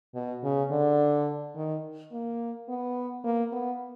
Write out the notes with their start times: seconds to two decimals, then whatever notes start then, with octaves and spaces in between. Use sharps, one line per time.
0.15 B2
0.43 C#3
0.71 D3
1.56 D#3
2.12 A#3
2.68 B3
3.24 A#3
3.53 B3